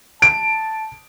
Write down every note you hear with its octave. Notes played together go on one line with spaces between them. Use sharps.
A5 D7